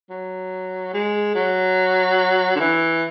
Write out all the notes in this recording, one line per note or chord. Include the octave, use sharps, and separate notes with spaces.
F#3
G#3
F#3
D3
E3